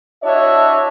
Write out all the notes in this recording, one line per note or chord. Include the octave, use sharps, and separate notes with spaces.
D4 E4 F#4 C#5 D#5 E5